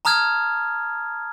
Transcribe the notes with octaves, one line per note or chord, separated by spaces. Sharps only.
A5 A#5 D#6 F6 G#6